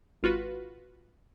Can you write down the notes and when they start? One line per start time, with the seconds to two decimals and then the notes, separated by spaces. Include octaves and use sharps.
0.23 G#1 F4 F#4 B4